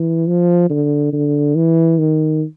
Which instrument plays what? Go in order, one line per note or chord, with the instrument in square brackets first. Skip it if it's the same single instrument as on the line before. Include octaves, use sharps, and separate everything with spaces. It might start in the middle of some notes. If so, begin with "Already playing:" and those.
Already playing: [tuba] E3
F3
D3
D3
E3
D#3